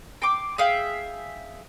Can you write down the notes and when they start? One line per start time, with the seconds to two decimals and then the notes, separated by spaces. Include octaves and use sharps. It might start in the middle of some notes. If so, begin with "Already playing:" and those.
0.22 G5 C6 D6
0.58 G#4 E5 F5 G5